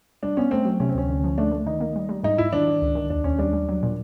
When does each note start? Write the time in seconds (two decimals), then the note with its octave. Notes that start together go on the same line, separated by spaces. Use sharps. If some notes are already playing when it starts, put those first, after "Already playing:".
0.23 G3 D4
0.37 B3 C#4
0.51 A3 C4
0.65 F#3
0.80 C3 C#4
0.89 C4
0.94 D2 C#4
1.09 D3
1.24 F3
1.38 A3 D4
1.52 A3
1.66 D#3 D#4
1.80 A#3
1.96 G3
2.09 G3
2.23 G#2 D#4
2.38 G#2 E4
2.52 D#3 D4
2.68 D#3
2.82 C#2
2.95 D#3
3.10 D#2 D4
3.24 D#2 C#4
3.39 G3 D4
3.53 G3
3.69 F#3
3.83 A#2